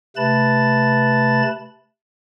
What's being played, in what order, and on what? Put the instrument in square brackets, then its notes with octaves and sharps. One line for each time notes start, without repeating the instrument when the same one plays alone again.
[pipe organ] C3 A3 B4 A5 B5 A6